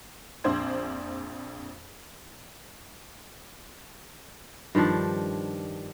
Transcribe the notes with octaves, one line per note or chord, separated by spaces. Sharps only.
A#1 F2 D4 C5 C6 G#6
G2 D#3 F3 D4